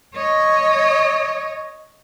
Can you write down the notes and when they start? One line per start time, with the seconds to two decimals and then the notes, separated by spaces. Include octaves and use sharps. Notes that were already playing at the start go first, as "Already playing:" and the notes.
0.14 C#5 D#5